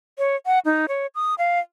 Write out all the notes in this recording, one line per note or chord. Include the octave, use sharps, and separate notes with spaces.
C#5
F#5
D#4
C#5
D#6
F5